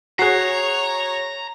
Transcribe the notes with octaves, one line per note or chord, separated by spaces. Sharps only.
F#4 G#4 C#5 A#5 F#6 C7